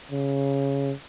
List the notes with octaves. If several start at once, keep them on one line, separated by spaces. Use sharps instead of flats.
C#3